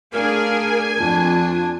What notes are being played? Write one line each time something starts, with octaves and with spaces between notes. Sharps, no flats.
A3 D4 G#4 A#4 F5 G#5
F2 D4 F4